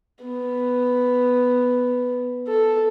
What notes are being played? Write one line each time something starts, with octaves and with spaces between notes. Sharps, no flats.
B3
A4